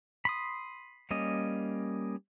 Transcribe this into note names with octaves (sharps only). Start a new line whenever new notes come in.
B5 C6 D#6
G3 A#3 C#4 D#5